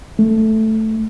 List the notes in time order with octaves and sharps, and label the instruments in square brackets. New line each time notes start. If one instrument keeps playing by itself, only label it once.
[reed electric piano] A3